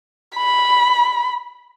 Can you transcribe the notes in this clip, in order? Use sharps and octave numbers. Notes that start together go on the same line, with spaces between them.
B5